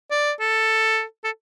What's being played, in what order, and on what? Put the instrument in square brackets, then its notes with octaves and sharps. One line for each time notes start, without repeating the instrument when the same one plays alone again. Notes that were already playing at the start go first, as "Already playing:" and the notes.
[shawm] D5
A4
A4